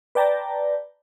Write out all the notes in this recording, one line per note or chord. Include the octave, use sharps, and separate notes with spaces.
B4 D5 G5 A5 A#5